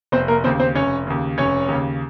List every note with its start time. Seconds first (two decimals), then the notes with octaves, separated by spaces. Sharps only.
0.12 F1 C4 C5
0.28 A#3 A#4
0.44 D#2 C#3 C4 C5
0.59 C4 C5
0.75 F1 C#4 C#5
1.07 D#2 C#3
1.38 F1 C#4 C#5
1.68 D#2 C#3